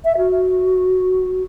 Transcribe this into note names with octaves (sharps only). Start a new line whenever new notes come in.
E5
F#4